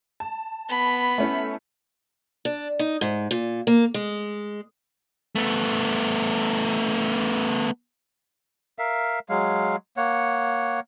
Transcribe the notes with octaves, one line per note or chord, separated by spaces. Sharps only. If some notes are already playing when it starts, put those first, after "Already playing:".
A5
B3 B5
A3 C#4 E4
D4
D#4
G#2
A#2
A#3
G#3
A3 B3
A#4 E5 F5
F#3 G#3 F5
A#3 C#5 F#5